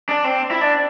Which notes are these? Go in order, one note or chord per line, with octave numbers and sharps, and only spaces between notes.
D4
C4
E4
D4